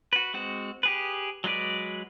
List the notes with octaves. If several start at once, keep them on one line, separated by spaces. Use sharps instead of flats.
F#4 B4
G#3 C4 F#4
G4 G#4 B4
F#3 G#3 F#4 B4 D5